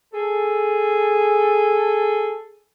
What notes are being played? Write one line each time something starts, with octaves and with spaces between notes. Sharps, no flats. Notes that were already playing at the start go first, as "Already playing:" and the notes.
G#4 A4